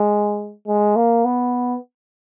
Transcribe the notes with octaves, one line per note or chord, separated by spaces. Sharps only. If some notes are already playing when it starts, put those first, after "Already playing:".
Already playing: G#3
G#3
A#3
B3